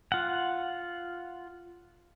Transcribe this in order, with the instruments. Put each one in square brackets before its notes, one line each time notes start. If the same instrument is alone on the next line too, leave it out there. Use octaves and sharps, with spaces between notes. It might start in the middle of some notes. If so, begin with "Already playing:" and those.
[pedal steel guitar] F4 F#5